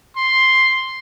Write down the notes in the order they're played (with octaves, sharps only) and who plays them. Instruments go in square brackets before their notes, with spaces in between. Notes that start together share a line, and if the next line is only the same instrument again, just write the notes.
[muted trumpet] C6